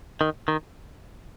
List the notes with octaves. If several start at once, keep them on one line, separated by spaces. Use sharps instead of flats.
D#3
D#3